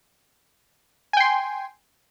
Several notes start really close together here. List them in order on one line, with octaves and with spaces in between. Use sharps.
G#5 G5 C6